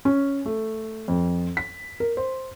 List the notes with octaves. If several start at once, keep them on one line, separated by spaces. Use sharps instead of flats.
C#4
A3
F2
B6
A#4
C5